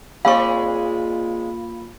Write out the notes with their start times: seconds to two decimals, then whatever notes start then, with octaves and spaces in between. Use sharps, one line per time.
0.25 G#3 A#3 C4 F4 D5 F5 B5 C#6